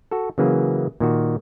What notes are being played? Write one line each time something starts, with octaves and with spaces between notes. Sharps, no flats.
F#4 A4
C#3 E3 F#3 A#3 G#4
A#2 D#3 F#4